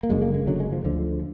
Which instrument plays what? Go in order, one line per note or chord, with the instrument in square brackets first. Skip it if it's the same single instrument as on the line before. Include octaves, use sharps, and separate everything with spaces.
[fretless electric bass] A#3
F#1 F#2 D3 G#3
A#3
G#3
F#1 F#2 D3 F#3
G#3
F3
D2 D3 F3